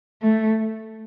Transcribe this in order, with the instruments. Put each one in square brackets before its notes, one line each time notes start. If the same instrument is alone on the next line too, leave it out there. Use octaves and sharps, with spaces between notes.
[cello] A3